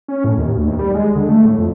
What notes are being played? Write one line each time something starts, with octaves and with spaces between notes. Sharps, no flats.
C#4
A2
D#2
D2
D#2
G3
G#3
D3
A3
A2
F2